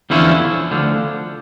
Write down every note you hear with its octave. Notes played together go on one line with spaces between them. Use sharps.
E2 D3 F3 C#4 E4
D2 D3 F3